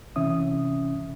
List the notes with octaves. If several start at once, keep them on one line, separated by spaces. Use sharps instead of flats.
C3 E3 C#4 E5 D#6